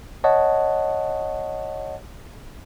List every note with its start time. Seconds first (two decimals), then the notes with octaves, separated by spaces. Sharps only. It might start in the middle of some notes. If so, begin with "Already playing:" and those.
0.24 C#5 D#5 F#5 A5